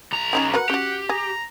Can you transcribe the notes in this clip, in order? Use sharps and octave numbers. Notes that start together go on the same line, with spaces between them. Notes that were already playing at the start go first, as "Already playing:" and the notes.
B1 A#5
C#4 D#4 G4 G#4
F#4 A#4 B4 F#5
C#4 F#4 G4
G#4 A#5